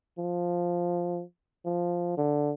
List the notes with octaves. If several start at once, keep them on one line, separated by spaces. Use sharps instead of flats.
F3
F3
D3